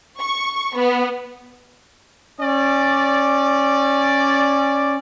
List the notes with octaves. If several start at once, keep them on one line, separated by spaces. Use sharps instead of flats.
C#6
B3
C#4 D5